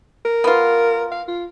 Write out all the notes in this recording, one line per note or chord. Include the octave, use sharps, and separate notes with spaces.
A#4
B3 F4
F5
F4